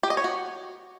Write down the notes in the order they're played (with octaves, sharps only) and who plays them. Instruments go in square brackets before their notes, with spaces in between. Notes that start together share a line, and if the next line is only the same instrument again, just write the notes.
[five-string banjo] G4
D#5
C#5
F#4